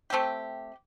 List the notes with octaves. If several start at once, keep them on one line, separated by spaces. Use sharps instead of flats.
A3 C4 G4